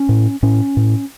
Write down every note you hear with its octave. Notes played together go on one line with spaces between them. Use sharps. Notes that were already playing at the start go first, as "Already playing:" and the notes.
Already playing: C#4
A2
A2 C#4
A2